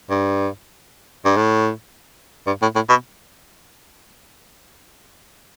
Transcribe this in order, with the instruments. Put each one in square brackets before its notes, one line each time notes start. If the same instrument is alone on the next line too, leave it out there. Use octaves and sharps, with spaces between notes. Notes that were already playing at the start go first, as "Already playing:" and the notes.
[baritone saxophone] G2
G2
A2
G2
A2
A2
B2